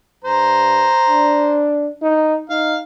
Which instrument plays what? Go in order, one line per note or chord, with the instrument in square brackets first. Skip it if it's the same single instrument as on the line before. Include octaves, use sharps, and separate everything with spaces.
[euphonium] G2 [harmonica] C5 A#5
[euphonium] D4
D#4
[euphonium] D#4 [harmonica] F5